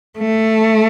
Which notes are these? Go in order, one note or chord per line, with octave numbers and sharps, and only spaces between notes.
A3